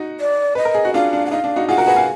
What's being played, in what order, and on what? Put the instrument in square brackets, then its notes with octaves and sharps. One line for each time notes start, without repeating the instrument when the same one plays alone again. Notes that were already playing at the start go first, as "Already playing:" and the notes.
Already playing: [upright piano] D#4 F#4
[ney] D5
[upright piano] B4 [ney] D#5
[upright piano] A#4
G#4
F#4
[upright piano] D4 F4 [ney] F5
[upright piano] D4
[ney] F#5
[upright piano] D#4 [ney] F5
[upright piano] D4
D#4 F#4
[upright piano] F4 G#4 [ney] F#5
[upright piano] F#4 A#4
G#4 B4
F5 G#5